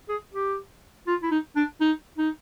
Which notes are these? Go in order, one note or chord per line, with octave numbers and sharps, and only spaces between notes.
G#4
G4
F4
E4
D#4
D4
D#4
D#4